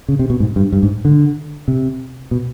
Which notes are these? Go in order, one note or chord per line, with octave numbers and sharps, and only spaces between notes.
C#3
C3
B2
G#2
G2
G2
G#2
D3
C3
B2